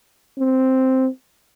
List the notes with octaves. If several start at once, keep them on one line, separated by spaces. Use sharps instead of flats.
C4